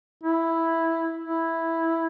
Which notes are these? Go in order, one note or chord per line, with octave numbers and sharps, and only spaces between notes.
E4
E4